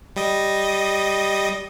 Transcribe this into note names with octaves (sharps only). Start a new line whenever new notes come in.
G3 D#5